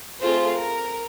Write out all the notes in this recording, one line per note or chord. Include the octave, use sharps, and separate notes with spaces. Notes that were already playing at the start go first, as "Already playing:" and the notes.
A3 C4 F4 G#4 C5
A#4